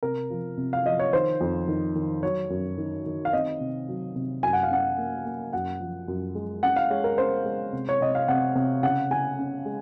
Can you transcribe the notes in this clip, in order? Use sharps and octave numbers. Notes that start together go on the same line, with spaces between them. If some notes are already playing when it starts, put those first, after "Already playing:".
C3 A#4
F3
C3
F5
F3 D#5
C#5
D#3 C5
F2
D#3
D#3
F#3 C#5
F#2
D#3
D#3
F5
C4 D#5
C3
F#3
C3
F#2 G#5
F#5
F5
C#4 F#5
A#3
A#3
F#2 F#5
F3
F#2
G#3
C#4 F#5
F5
G#3 C#5
A#4
C#4 C5
G#3
C3
C#5
C3 D#5
F5
C3 F#5
C3
C#3 F#5
C#3 G#5
C#4
G#3